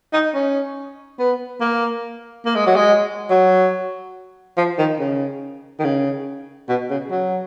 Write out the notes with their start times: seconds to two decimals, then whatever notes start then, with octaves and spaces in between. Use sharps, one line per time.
0.13 D#4
0.34 C#4
1.19 B3
1.61 A#3
2.46 A#3
2.55 G#3
2.67 F#3
2.76 G#3
3.30 F#3
4.57 F3
4.79 D#3
5.00 C#3
5.80 D#3
5.84 C#3
6.69 B2
6.90 C#3
7.11 F#3